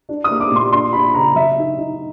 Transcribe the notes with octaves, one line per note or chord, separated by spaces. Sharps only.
D4
D#6
A#3
D6
A#2 C6
D4 C6
D4 B5
C#3 A#5
F#3 E5
D#4
D#4